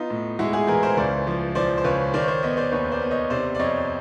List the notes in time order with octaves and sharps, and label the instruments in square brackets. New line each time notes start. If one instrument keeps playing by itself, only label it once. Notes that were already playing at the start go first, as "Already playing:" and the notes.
Already playing: [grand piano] B3 D#4 F4
A2
G#3 E4 F#4
F#4 G#4
E3 G#4 A#4
A#4 C5
C#2 C5 D5
F3
F3 C5 D5
C5
C#2 B4 C#5
D#3 C5 D5
C#5
C5 D5
B3 C#5 D#5
C5 D5
D#2 B4 C#5
C5 D5
B3
C#5 D#5
C3 C5 D5
D5
F2 C#5 D#5